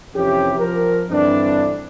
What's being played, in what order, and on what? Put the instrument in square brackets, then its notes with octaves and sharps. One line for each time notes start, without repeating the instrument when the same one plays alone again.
[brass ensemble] F2 C3 E3 C#4 G4
F3 A#4
G2 D3 E3 C4 D4